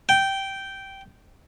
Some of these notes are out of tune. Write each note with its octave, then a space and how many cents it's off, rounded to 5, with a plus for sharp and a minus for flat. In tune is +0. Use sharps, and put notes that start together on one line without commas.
G5 -10